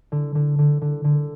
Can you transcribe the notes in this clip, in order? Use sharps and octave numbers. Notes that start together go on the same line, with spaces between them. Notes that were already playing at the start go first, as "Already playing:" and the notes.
D3
D3
D3
D3
D3